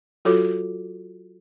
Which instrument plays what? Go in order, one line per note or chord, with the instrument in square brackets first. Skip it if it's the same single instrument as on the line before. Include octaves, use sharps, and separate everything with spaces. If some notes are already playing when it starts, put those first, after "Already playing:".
[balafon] F#3 F4 F#4 A4 C#5 D6